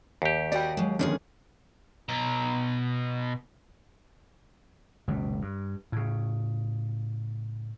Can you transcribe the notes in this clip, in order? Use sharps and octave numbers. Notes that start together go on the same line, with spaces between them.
D#2 G4
F#4 D5 D#5 F#5 G5
F#3 G#3
F2 D3 D#3 A#3 C#4 G#4
B2 A#5
F#1 C#2 B2
G2
A2 C#3